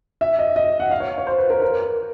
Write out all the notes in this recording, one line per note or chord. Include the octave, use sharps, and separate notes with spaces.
E5
D#5
D#5
F#5
F5
C#5
C#5
C5
B4
A#4
A#4